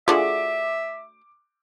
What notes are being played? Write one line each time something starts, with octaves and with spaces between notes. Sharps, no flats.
A3 D4 F4 F#4 G#4 E5 D6